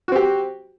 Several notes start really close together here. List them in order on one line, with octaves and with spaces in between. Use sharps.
F#4 C4 G4